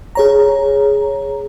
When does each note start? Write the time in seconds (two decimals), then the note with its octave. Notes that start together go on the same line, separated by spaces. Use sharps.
0.15 G#4 C#5 A#5